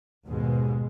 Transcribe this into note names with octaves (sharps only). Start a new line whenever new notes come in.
D#2 G#2 B2 G#3